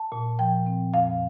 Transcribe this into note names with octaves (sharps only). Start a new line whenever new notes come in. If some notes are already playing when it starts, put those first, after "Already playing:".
Already playing: A5
A#2
F3 G5
C4
F2 F5